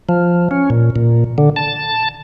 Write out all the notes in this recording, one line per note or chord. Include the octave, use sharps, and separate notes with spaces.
F3
C#4
A#2
A#2
D3
A5